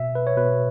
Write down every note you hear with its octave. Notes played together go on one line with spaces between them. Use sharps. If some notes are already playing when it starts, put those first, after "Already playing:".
Already playing: B2 E5
B4
C#5
B2 B4